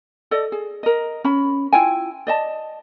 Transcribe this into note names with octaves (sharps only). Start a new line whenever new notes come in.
A4 D5 D#5
G#4
A#4 D#5
C#4 B5
E4 F4 G5 G#5
D5 D#5 A5